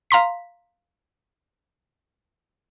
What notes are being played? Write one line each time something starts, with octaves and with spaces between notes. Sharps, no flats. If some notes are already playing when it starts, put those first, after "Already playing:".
F5 A#5 C6 B6